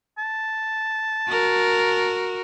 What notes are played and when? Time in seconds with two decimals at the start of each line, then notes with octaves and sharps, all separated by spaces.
0.18 A5
1.29 F#4 A#4